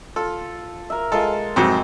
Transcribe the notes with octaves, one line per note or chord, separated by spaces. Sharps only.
F4 A4
A#4 E5
G#3 F4 A4
F2 G#2 C3 F#3